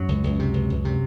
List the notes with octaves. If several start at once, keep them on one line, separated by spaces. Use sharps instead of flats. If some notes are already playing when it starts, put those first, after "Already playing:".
Already playing: F#2 F#3
C#2
C#2
C3
C#2
C#2
C3